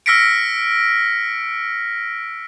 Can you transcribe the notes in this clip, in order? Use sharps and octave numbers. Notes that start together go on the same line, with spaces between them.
E6 F6 A#6 B6 C#7 D7